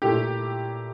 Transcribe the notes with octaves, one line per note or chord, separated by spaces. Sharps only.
A#2 A3 E4 G4